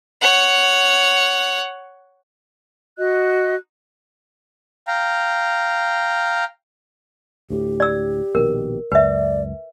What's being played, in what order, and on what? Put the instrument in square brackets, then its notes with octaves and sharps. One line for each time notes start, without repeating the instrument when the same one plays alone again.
[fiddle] C#5 F#5
[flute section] F#4 D#5 F#6
[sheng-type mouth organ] F5 G5 A#5
[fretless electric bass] D2 A2 [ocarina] G4
[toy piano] D5 E6
[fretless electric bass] A#1 B2 D#3 [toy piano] A#4
[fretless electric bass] C#2 F#2 [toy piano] B4 E5 [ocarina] D5